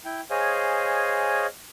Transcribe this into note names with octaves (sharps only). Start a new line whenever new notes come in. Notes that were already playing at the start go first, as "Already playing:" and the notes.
E4 G5
G#4 C5 C#5 D#5 F5 G#5